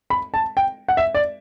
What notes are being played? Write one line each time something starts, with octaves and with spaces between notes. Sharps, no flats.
B5
A5
G5
F#5
E5
D5